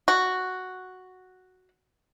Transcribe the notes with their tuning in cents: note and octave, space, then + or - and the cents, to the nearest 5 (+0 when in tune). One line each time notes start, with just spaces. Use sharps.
F#4 +0